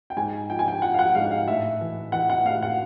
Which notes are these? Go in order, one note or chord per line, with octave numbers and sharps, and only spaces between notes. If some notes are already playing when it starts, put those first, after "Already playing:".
G5
G#2 G#5
F3 G5
G#5
G5
F3 F#5
F5
F#5
G#2 F5
F5
A2 E5
E3
E3 F#5
F#5
A2 F5
F#5